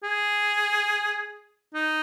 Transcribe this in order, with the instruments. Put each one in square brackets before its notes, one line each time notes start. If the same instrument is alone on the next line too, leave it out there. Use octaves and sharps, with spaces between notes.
[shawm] G#4
D#4